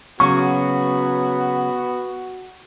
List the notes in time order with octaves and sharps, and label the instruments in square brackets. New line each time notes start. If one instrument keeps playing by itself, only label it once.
[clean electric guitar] C#3 F#3 [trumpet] B3 [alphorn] F#4 [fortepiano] C#6